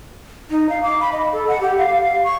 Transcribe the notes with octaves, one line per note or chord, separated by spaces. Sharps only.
D#4
F5
D6
B5
D#5
A4
F#5
G4
F5
F5
C#6